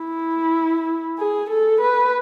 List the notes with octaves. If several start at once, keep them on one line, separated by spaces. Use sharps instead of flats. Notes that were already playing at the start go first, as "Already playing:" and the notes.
Already playing: E4
G#4
A4
B4